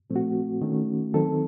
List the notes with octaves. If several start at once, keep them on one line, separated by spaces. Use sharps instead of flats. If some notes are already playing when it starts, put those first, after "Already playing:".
A#2 F3 A3 C4
F#4
D#3 A3 C#4
D#3 F#3 C4 A4